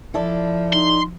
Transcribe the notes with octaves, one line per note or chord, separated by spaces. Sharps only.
F3 E4 A4 D5
D#4 C6